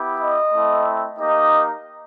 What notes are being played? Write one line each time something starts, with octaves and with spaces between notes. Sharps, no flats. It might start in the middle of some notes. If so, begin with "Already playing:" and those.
Already playing: B3 E4 G4
D#5
A3 C4 E4
A#3 D#4 G4 D#5